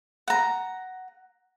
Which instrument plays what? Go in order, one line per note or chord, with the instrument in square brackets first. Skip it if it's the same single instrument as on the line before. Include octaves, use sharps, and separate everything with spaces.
[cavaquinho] F#5 A#5